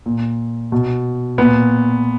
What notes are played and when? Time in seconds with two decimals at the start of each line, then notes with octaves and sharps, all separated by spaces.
0.06 A#2
0.72 B2
1.38 A#2 B3